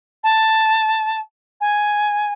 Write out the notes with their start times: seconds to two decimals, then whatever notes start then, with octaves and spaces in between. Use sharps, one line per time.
0.23 A5
1.60 G#5